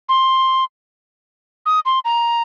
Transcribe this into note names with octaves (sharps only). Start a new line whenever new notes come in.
C6
D#6
C6
A#5